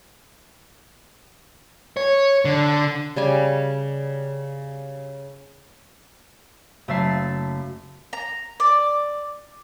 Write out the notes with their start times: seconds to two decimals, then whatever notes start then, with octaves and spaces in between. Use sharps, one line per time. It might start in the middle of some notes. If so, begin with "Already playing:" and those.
1.97 C#5
2.45 D3
3.16 C#3 G3 G#5
6.88 F#1 A3 E5 A6 C7
8.13 A#5
8.60 D5